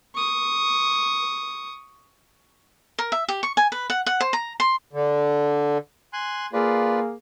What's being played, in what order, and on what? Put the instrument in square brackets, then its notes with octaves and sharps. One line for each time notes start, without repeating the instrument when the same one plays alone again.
[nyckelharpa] C#6 D#6
[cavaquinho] A#4
E5
G4
C#6
G#5
B4
F#5
F#5
C5
A#5
C6
[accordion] D3
[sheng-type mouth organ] G#5 C6 F#6
[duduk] A#3 [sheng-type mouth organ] F4 B4 D5 [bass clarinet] G#4